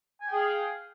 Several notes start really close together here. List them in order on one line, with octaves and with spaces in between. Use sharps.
G#5 G5 G#4 F5